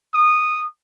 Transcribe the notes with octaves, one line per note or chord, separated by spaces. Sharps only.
D#6